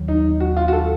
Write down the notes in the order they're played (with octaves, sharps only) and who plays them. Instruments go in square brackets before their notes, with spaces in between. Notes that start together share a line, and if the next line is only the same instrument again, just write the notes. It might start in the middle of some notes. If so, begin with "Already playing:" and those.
Already playing: [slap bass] D#2 D#3 F#3
[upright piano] D#4
F#4
F4
F#4
A4